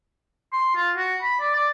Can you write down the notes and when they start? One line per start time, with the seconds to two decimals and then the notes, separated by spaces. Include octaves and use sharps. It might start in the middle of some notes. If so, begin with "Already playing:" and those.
0.53 C6
0.75 F4
0.96 F#4
1.22 B5
1.40 D5
1.55 D5